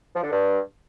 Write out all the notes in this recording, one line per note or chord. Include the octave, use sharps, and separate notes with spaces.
F3
D3
G2